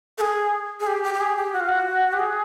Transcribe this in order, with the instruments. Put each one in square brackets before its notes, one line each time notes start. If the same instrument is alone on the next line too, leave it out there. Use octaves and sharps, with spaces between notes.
[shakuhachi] A4
G#4
G#4
G4
G4
G4
G#4
G4
F#4
F4
F#4
G4
G#4